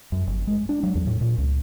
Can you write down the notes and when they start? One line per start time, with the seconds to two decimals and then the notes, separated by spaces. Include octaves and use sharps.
0.12 F#2
0.27 G1
0.47 G#3
0.69 D4
0.83 F#3
0.95 E2
1.07 A2
1.21 A#2
1.38 C#2